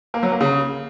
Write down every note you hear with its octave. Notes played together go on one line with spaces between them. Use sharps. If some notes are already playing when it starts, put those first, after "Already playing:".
A#3
F#3
A#3
C#3